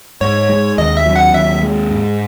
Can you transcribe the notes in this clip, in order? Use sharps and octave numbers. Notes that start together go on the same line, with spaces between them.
G#2 C#5
G#3
D#2 D#5
E5
F#3
F#5
D#2 E5
G#3
G#2